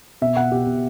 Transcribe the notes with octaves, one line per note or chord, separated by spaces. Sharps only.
B2 E5
B2 F#5
B2 G4
B2